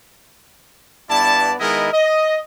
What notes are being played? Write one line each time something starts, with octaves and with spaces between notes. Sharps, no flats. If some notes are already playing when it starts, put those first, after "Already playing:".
G2 B3 E4 D5 A5
D#3 G#3 B3 E4 A#4 D#5
D#5